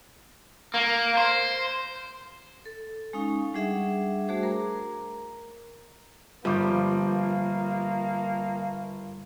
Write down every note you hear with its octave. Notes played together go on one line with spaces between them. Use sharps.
A#3
C5
A4
G#3 C#4 D#4 F5 C#6
G3 D4 G#4 E5 F#5
G3 A3 F#4 G#4 C5 D6
A#4 A#5
G1 F3 G3 A#3 D6 G6